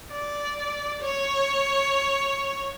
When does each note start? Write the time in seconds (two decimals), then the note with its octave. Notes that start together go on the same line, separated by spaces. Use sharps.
0.13 D5
1.02 C#5